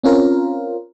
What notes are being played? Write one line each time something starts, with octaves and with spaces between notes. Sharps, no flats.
C4 C#4 F4 A#4